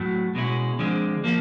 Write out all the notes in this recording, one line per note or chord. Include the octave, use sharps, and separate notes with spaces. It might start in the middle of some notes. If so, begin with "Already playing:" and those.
Already playing: A2 F#3 A3
B2 G#3 C#4 E4
D3 F3 G#3 C4
F3 A#3